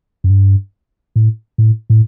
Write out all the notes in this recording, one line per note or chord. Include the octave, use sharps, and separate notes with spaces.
F#2
G2
A2
A2
A2